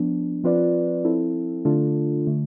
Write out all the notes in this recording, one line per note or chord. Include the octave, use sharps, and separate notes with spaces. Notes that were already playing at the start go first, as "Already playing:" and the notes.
Already playing: F3 B3 D4
F3 C4 F4 B4 D5
F3 C4 E4 A4
D3 A3 D4 F4 A4
D3 A3